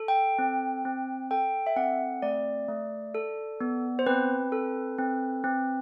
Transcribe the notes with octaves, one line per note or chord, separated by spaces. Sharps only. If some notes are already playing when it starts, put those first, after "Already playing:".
Already playing: A4
G5
C4
C4
A4 G5
E5
C4 F#5
A3 D5
A3
A4
B3
C5
C4 B4
A4
C4
C4